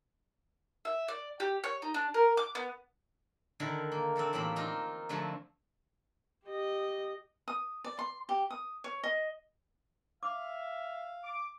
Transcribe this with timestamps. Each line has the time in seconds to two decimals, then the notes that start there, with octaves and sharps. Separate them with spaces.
0.85 E5
1.08 D5
1.40 G4
1.64 C#5
1.82 D#4
1.94 D4
2.14 A#4
2.37 D6
2.55 B3
3.60 D3 D#3 E4 A#4
3.92 A#3
4.16 C4 D4 A4 A#4
4.33 E2 A2 G3 A#3 C5 B5
4.56 C4 D#4 F4 A#5
5.09 F2 D3 F3 A3 A5 A#5
6.45 G4 D#5
7.48 D#6
7.84 D5
7.99 C6
8.29 G4
8.50 D#6
8.84 C#5
9.03 D#5
10.23 E5 F5 D6
11.24 D6